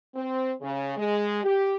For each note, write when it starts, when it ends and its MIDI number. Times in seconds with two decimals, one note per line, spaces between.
0.15 0.52 60
0.61 0.92 49
0.97 1.40 56
1.44 1.76 67